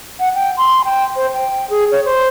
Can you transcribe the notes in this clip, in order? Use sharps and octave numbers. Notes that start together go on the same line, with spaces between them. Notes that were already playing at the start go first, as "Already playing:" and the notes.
F#5
G5
C6
G5
C5
G5
G#4
C#5
C5